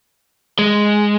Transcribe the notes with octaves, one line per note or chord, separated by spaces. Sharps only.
G#3